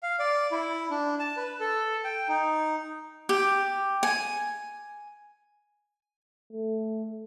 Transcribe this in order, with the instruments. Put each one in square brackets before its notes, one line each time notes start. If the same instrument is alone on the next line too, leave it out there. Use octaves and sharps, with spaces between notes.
[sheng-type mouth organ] F5
D5
E4
D4
A5
B4
A4
G5
D#4
[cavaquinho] G4
G#5
[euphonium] A3